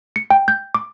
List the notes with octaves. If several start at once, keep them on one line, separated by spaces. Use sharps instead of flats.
C#7
G5
G6
D6